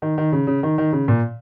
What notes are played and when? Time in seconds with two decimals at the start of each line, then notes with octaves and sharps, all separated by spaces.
0.02 D#3
0.18 D#3
0.32 C#3
0.47 C#3
0.63 D#3
0.78 D#3
0.92 C#3
1.08 A#2